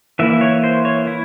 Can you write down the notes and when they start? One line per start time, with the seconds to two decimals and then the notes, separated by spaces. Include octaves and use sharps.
0.19 E3 A#3 E4 E5
0.41 C#5
0.64 C5
0.85 C#5
1.07 E4